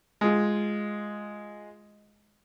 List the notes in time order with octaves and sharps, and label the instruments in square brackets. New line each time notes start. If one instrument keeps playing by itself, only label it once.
[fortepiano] G#3 F4